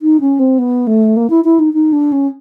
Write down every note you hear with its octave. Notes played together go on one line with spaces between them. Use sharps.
D#4
C#4
C4
B3
A3
A#3
E4
E4
D#4
D#4
D4
C#4